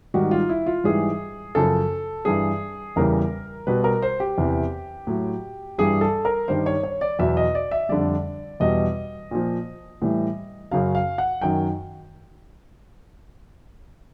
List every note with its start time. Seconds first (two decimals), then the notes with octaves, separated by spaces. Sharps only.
0.14 G#2 D#3 G3 F#4
0.31 F4
0.49 E4
0.66 F4
0.84 G#2 E3 G3 G#4
1.55 F#2 C#3 F3 A4
2.25 G2 E3 G3 G#4
2.96 E2 C#3 E3 G3 A#4
3.67 B2 G3 B4
3.84 A#4
4.02 C5
4.20 G4
4.38 E2 C3 E3
5.07 A2 F#3
5.78 G2 E3 G3 G#4
6.01 A4
6.25 A#4
6.48 G2 D#3 G3 C5
6.66 C#5
6.83 C#5
7.01 D5
7.19 E2 B2 F#3 E5
7.37 D#5
7.55 D5
7.71 E5
7.89 F2 D3 G3 D5
8.60 E2 B2 G3 D#5
9.31 A#2 F3
10.02 A2 E3 G3
10.71 F#2 C#3 F#3 F5
10.95 F5
11.18 F#5
11.41 F#2 D#3 F#3 G5